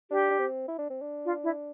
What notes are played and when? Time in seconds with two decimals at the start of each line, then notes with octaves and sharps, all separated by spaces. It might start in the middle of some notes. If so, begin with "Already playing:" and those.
0.11 D4 G4
0.31 D4
0.39 C4
0.68 E4
0.79 D4
0.90 C4
1.01 D4
1.25 F4
1.43 E4